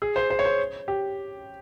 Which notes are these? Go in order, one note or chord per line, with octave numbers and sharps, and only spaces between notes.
G#4
C5
C5
C#5
C5
G4